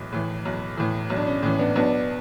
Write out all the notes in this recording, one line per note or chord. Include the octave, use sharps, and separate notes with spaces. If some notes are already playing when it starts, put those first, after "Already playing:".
Already playing: B1 A2 E3
A2 E3
B1
A2 E3
B1
D4
C#4
A2 E3 C#4
B3 D4
B1 B3 D4